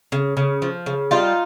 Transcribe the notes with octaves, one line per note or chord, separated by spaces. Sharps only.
C#3
C#3
F3
C#3
G3 D#4 F4